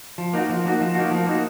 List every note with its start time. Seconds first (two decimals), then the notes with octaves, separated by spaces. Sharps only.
0.18 F3
0.33 A#3 D#4 F#4
0.49 F3
0.65 A#3 D#4 F#4
0.81 F3
0.95 A#3 D#4 F#4
1.11 F3
1.27 A#3 D#4 F#4